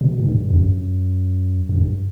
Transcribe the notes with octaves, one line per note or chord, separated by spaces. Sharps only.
B2
G#2
G2
F2
F#2
F#2
G2